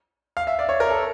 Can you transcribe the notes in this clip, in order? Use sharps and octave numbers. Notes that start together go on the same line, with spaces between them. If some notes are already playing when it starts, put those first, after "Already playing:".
F5
E5
D5
C#5
A#4
A4